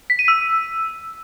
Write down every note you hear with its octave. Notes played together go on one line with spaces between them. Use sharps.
B6
D#7
E6